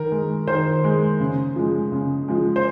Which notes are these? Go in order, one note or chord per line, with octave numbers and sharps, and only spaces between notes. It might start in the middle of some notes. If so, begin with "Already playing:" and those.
Already playing: D#3 A#4
G#3
D#3 C5
G#3
C#3
F3 G#3
C#3
F3 G#3
C5